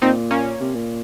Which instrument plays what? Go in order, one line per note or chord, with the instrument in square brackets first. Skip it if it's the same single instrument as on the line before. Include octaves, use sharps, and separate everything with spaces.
[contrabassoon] A#2 [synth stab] C4 D#4
[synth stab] A#3 C#4
[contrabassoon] C3
A#2